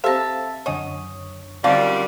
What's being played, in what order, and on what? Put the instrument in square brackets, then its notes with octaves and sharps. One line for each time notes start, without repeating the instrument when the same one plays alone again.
[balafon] C4 G4 [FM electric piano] A4 C5 F5 [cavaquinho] E5 A5
[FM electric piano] F#2 D3 C#5 [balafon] D#5 F#5 G#5 [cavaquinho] D#6
[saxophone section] F#2 D#3 G3 [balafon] D3 C4 A5 [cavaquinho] F4